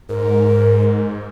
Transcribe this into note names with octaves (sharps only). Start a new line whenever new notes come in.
G#2 A#4